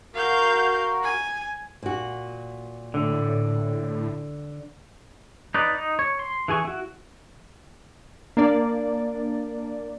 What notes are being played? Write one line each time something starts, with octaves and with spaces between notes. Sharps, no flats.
F#4 A#4 F5 G6
G#5
A#2 F#4
A2 D3
D#4 B4 D5
D#4
C#5
C6
E3 G#4 G#5 C#6
E4 F#4
A#3 D4 D5